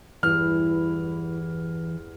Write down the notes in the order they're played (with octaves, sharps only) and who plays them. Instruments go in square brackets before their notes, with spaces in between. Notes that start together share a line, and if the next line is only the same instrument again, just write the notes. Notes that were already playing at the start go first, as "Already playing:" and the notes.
[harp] E2 G2 [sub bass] E3 [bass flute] E4 [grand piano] F6